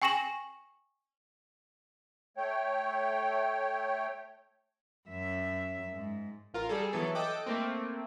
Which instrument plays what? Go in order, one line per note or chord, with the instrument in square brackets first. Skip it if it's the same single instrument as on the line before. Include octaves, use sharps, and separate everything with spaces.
[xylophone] G5 G#5 C#6 A#6 E7 F#7
[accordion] A3 C#5 G5
[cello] F#2 E5
G#2
[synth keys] A1 F4 A#4
G3 G#4 A4
E3 F#3 B3 A4
A4 D#5 G5 D6 F#6
A3 A#3 C4